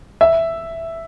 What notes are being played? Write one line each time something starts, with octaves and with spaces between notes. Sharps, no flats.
E5